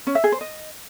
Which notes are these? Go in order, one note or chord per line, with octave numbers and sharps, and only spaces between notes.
C#4
E5
G#4
C5
D#5